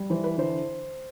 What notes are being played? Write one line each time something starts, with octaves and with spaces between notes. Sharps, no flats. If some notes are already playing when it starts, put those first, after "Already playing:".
Already playing: G3
E3 C5
B4
D3 C5